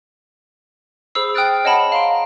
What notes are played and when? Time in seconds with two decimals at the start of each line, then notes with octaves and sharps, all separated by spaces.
1.15 G#4 C5 B5 E6 C7
1.34 G5 D#6 F6 F#6 A6 D7
1.64 C#5 D#5 F#5 A5 B5
1.92 F5 A#5 C6 D7